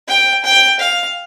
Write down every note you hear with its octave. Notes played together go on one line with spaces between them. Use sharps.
G5
G5
F5